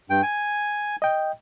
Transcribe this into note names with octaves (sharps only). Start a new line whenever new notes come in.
G2 G5
G#5
D#5 G5